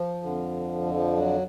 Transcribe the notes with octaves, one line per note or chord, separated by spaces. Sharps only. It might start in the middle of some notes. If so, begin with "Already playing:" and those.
Already playing: F3
F2 D3
F3
F#3